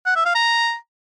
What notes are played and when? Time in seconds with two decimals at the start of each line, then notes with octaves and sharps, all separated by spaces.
0.06 F#5
0.16 E5
0.25 F5
0.35 A#5